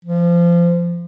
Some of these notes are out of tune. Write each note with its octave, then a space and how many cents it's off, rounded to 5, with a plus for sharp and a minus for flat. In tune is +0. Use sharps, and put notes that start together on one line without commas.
F3 -25